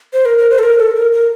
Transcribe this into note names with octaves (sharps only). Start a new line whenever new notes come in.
C5
A#4
A#4
C5
A4
A#4
A4
A#4
A#4